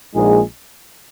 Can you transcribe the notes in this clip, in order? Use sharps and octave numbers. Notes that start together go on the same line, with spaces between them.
A#1 A#2 G#3 D#4 G#4